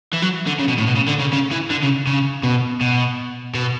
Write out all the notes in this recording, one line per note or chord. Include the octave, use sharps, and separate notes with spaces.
E3
F#3
D3
C#3
B2
A2
B2
C#3
D3
C#3
C#3
E3
D3
C#3
C#3
B2
B2
B2